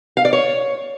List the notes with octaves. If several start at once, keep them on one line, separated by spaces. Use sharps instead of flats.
F5
D5
C#5